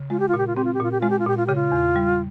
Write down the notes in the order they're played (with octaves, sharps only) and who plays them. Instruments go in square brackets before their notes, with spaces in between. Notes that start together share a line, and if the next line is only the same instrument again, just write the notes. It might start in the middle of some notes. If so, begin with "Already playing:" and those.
Already playing: [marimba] C#3
[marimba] G#3 [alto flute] F4
[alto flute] G4
F4
[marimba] A#2 [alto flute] G4
[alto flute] F4
[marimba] C4 [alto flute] G4
[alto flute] F4
G4
[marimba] A#2 [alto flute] F4
[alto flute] G4
[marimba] G#3 [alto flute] F4
[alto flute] G4
F4
[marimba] A#2 [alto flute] G4
[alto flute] F4
[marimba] C#3 [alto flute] G4
[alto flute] F4
[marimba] E2
G3